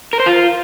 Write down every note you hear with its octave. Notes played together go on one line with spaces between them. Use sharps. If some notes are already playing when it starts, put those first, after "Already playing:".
A#4
C5
F4